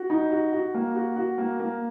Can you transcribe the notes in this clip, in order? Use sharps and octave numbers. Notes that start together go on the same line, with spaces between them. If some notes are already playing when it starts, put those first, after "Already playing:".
Already playing: F#4
D#4
F#4
F#4
A#3
F#4
F#4
A#3
A#3